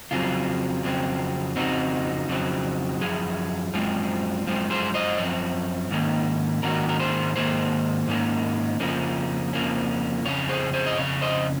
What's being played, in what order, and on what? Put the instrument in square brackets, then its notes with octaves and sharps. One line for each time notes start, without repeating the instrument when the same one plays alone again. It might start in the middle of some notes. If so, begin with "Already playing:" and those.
[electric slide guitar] F2 C#3 F#3 C4 F4 G#4
F2 C#3 F#3 C4
F2 C#3 F#3 C4 D#4 F#4
F2 C#3 F#3 C4
F#2 F3 G#4
F#2 F3 G#3 C4
F#2 F3 G#3 C4
G#4 C5
C5 D#5
F#2 F3 C4 C#5
G#2 D#3 A#3 C#4
G#2 D#3 A#3 C#4 F#4 A#4
A#4
G#4 C5
G#2 D#3 A#3 G#4 C5
G#2 D#3 A#3 C#4
F2 C#3 F3 A#3 C#4
F2 C#3 F3 A#3 C#4
F2 C#3 C#4 C#5
G#4 C5
G#4 C5
D#5
F2 C#3 C#4 C#5
C5 D#5